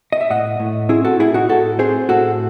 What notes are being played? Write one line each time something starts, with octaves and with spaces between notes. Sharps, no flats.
D#5
E5
A2 D#5 F#5
A2
C4 E4 G#4
F#4 A4
A2 E4 G#4
D#4 F#4
A2 F#4 A4
C4 G#4 C5
A2 F#4 A4